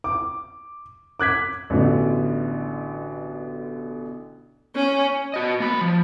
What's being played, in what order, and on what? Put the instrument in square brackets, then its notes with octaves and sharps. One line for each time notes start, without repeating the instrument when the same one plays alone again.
[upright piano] D6
D6 F#6 G#6 B6
A1 B2 D3
[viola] C#4
[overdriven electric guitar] F#4 D#5
A#3 B5
F3